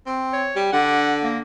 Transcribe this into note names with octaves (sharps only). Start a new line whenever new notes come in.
C4
C#5
G3
D3 F#5
A#3